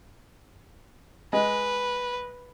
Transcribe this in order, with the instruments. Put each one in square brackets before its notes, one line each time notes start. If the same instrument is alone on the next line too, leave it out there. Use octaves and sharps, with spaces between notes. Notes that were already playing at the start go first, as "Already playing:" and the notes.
[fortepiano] G#3 [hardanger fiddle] B4